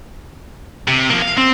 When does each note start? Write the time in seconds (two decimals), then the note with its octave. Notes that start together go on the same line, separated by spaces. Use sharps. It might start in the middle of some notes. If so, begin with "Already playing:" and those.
0.88 C3
1.10 F3 A#3
1.22 F5
1.37 C4